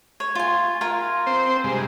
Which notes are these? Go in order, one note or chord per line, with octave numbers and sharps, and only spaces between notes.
C#5
F4 G#5
F4 A#4 G#5
C4 C5
G2 C3 G#3